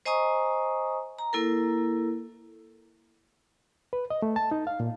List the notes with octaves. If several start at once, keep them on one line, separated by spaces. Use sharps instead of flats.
C5 D#5 G#5 A#5 C#6 D#6
A#5
A#3 E4 A4 A#4
B4
D#5
A3
A5
D#4
F5
A#2